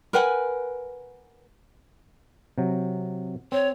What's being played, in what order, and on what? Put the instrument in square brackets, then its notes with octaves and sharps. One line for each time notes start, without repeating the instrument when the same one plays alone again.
[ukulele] A#4 B4 F#5 G#5
[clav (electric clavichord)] C3 F#3
[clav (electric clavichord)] C4 [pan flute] C#5